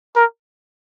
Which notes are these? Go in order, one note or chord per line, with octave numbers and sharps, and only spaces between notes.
A#4